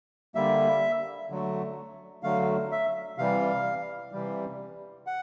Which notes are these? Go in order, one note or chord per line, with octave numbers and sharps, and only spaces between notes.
D3 G3 A#3 E5
D3 F#3 A3
D3 F#3 A3 F5
E5
C3 E3 G3 F5
C3 E3 G3
F#5